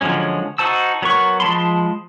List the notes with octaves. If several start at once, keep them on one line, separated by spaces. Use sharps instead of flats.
D3 F3 F#3 G#3 C#4
D#4 F#4 C5 A5 E6
F#3 B3 A#4 C#6 F#6
F3 G#3 A5 B5 C6